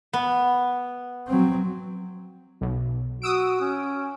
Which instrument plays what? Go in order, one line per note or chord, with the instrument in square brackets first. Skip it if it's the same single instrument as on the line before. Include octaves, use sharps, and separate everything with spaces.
[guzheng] B3
[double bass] F#3 C4
[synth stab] B1
[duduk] F#4 [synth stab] D#6 E6 D7
[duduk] C#4